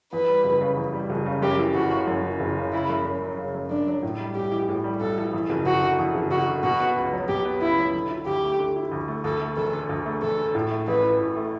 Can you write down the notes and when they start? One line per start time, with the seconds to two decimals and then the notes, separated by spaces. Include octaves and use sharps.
0.13 E2 B4
0.29 G3
0.44 F#1
0.61 C#3
0.77 E2
0.94 G3
1.10 F#1
1.26 C#3
1.42 F#2 G4
1.59 E3
1.75 F#1 F#4
1.91 C#3
2.07 F#2
2.23 E3
2.40 F#1
2.57 C#3
2.73 C#3 E4
2.89 F#2
3.05 F#2
3.22 F#3
3.39 C#3
3.54 F#2
3.70 F#2 D4
3.87 F#3
4.03 A2
4.20 G3
4.35 B1 G4
4.52 E3
4.69 A2
4.84 G3
5.00 B1 A4
5.18 E3
5.33 E2
5.50 F#1
5.66 F#1 F#4
5.82 D3
5.99 E2
6.15 F#1
6.31 F#1 F#4
6.48 D3
6.63 B2 F#4
6.80 B3
6.97 C#2
7.13 F#3
7.28 B2 G4
7.45 B3
7.61 C#2 E4
7.78 F#3
7.94 D3
8.11 E4
8.26 D2 G4
8.43 A3
8.59 D3
8.76 E4
8.92 D2
9.08 A3
9.24 D2 A4
9.40 A3
9.56 E1 A4
9.73 D3
9.89 D2
10.06 A3
10.22 E1 A4
10.38 D3
10.55 A2
10.71 A3
10.88 A1 B4
11.03 E3
11.20 A2
11.36 A3